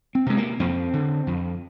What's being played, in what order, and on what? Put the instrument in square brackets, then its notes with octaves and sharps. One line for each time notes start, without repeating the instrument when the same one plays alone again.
[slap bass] C4
C3 G#3
A#3
F2 C4
D3
F2